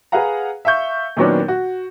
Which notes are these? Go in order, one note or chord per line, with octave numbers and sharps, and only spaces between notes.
G#4 B4 F5 F#5 A#5
E5 F5 C#6 G6
A#2 D#3 F#3 B3 C#4 D4
F#4